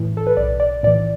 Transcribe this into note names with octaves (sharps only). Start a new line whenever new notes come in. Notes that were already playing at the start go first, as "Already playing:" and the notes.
Already playing: A2 E3
A4
B4
B1 D5
D5
A2 E3 D5